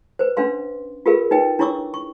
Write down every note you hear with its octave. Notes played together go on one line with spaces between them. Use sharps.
B4 C5
C#4 D4 B4 F5 C6
F4 G4 G#4 A#4 B4 F5
D#4 B4 D#5 G5
D4 E4 C#5 C#6 D6 E6
C#6